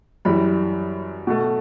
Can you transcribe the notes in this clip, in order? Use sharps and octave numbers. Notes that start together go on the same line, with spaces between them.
F#2 E3 G3 B5
B2 A3